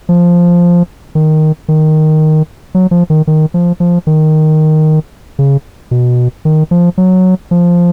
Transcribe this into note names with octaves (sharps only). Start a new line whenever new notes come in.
F3
D#3
D#3
F#3
F3
D#3
D#3
F3
F3
D#3
C#3
B2
D#3
F3
F#3
F3